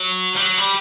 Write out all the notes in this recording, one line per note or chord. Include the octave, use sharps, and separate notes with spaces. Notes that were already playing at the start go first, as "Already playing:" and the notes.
Already playing: F#3
G3
F#3
G3